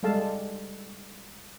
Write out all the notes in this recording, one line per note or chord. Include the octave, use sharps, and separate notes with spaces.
G3 G#3 A4 F5 A5